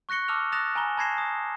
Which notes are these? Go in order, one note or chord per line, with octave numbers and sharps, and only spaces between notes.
C#6 F#6 A#6 C#7 G7
A5 D6 E6 F6 F7
D#6 F#6 A6 A#6 E7 F7
G#5 A#5 B5 G7
A5 B5 G#6 A#6 C7 E7
D#6